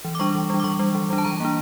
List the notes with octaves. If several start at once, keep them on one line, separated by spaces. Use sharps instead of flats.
E3
D6
G3 D4 C#6
E3
G3 D4
D6
E3 C#6
G3 D4
E3
G3 D4
A5
E3 A#5
A#3 D4